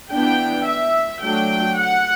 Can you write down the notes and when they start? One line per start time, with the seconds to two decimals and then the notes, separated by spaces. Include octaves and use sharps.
0.12 E3 B3 D4 G5
0.68 E5
1.24 F#3 A3 D4 G5
1.80 F#5